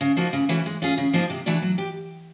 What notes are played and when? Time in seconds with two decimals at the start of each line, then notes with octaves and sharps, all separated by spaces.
0.01 C#3
0.17 F3 A#3 D#4 F#4
0.33 C#3
0.49 E3 A3 C#4 F#4
0.66 G#3
0.82 C#4 F4 G#4
0.97 C#3
1.13 F3 A#3 D#4 G#4
1.30 C3
1.46 E3 A3 D4 F#4
1.62 F#3
1.78 G4